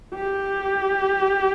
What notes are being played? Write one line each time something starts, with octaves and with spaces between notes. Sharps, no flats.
G4